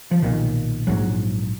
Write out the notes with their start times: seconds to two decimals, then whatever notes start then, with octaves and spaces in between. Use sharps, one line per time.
0.11 F3
0.22 B1 A#2 D#3
0.87 A#1 G#2 F#3